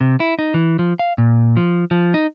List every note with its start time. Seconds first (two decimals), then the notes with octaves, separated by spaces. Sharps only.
0.01 C3
0.20 E4
0.39 D#4
0.54 E3
0.79 F3
0.99 F5
1.18 A#2
1.57 F3
1.91 F3
2.14 D#4